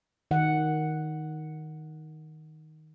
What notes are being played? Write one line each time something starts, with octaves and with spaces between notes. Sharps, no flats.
D#3 F#5